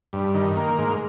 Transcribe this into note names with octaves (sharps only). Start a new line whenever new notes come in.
G2
D#3
A#3
G#2